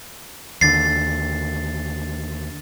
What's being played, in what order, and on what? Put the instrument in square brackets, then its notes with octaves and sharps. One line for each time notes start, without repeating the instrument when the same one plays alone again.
[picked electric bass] D#2 D3 [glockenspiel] A6 C7